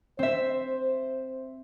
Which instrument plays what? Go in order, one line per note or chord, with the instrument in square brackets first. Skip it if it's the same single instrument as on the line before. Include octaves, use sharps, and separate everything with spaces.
[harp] C4 E5 [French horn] C5